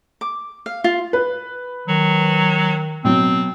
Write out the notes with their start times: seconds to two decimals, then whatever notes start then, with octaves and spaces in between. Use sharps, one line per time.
0.21 D6
0.66 F5
0.84 F4
1.13 B4
1.88 D#3 F#3
3.05 B2 F#3 C4